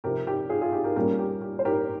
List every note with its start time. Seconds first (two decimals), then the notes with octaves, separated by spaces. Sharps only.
0.04 C3 F3 C4 G4 A#4
0.27 G4
0.49 F4 G#4
0.61 F4 G#4
0.73 G4
0.84 G4 A#4
0.96 A#2 G3 A#3 C#4 G4 A#4
1.19 G4
1.42 G4
1.59 C5
1.65 G4 A#4